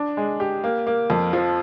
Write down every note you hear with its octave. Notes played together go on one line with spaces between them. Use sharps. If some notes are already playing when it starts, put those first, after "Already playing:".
Already playing: D4
G#3
G4
A#3
A#3
F2
F3